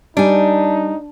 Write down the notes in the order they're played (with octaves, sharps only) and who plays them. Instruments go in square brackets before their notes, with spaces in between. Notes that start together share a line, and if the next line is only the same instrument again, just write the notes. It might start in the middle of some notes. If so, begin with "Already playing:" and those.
[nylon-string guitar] G3 G#5 [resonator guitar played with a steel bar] D4 [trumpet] D#4